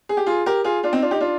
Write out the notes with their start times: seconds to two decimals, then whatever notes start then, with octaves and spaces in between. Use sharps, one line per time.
0.09 G#4
0.17 G4
0.26 F4 G#4
0.46 G4 A#4
0.64 F4 G#4
0.83 D4 F4
0.93 C4 D#4
1.02 D4 F4
1.11 D#4 G4
1.21 D4 F4